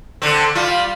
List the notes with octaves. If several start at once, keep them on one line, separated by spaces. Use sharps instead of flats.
D3 C4
G3 F4